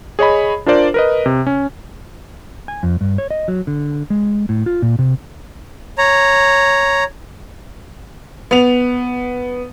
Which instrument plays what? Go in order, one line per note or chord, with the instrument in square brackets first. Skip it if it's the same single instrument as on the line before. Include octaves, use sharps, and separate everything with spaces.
[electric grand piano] G#4 C#5 D#5 B5
D4 F4 A#4 C5 D5
A#4 B4 D#5
C3
C#4
[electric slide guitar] G#5
F2
G2
C#5
D#5
F#3
D3
G#3
A2
F4
A#2
C3
[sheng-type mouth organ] C#5 A#5
[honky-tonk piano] B3 F7